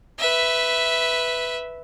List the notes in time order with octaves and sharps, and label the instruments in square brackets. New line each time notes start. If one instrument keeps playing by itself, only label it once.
[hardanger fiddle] B4 E5